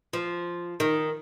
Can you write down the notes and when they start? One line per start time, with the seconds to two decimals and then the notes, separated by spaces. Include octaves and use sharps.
0.13 F3
0.80 D#3